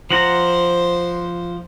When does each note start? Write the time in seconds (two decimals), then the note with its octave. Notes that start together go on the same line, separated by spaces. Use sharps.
0.11 F3 C5 F#5 A#5